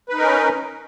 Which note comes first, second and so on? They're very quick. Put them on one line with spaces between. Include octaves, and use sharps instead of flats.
B4 D#4 A#4 C#4